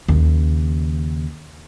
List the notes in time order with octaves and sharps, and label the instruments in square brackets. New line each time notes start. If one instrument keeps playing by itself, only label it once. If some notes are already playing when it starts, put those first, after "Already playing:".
[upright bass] D#2 C#3